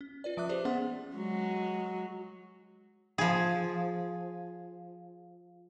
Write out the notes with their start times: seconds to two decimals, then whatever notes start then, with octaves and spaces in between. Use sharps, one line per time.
0.01 C#4
0.24 F4 B4 D5
0.37 F3 E5 D6 F#6
0.49 G4 G#4 C5 D5
0.65 B3 C#4 G#4 F#5 C6
1.15 F#3 G#3
3.18 F3 G#4